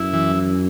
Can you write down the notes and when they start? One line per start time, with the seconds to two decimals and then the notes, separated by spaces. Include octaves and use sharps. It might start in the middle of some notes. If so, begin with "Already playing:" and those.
Already playing: F#2 E4
0.13 E3